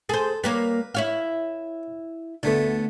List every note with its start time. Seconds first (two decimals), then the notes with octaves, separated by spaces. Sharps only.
0.09 G#4 A4 C5
0.44 G3 A#3 B4 C#5
0.95 E4 C#5 F5
2.43 D2 D3 A3 B3